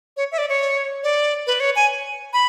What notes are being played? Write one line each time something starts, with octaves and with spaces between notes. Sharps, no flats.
C#5
E5
D5
C#5
D5
B4
C#5
G#5
B5